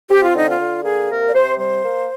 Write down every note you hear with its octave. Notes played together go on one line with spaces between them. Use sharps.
C4 G4
F4
D3 D#4
F4
D3
A#3 G#4
C3 A#4
D5
C3 C5
G3 C5
A#3